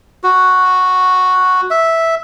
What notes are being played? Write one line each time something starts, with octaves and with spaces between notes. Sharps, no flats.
F#4
E5